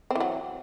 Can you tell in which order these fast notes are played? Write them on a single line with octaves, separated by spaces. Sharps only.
C4 E3 F#3